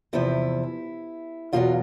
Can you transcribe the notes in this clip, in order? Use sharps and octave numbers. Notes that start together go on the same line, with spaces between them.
E2 C3 F3 E4
E2 B2 F#3 F4